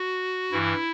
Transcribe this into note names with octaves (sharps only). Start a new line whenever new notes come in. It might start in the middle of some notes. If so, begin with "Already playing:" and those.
Already playing: F#4
G2 E3 E4